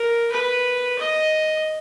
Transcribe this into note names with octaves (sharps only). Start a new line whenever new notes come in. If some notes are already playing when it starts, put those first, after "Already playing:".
Already playing: A#4
B4
D#5